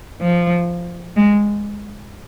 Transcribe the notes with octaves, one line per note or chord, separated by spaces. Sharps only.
F3
G#3